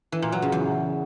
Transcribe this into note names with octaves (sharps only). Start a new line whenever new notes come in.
E3
A#2
F#3
C#3
E2